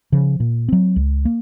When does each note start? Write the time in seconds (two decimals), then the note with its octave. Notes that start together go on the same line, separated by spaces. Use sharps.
0.12 C#3 F3
0.40 A#2
0.68 F#3 C4
0.96 C#2
1.25 A#3